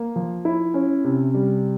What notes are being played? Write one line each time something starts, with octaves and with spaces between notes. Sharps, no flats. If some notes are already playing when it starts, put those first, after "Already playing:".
Already playing: A#3
F3
E4
C#4
C3
G3